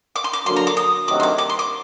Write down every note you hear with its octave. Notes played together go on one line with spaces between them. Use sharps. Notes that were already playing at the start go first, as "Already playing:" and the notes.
D6
C6
D6
D3 F#3 A#3 C6
A#5
D6
D#6
D2 C3 D#3 F#3 D6
C6
D6
D6
C6
D6